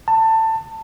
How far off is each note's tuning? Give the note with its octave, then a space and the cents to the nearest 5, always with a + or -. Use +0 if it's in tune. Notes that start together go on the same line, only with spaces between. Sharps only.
A5 +20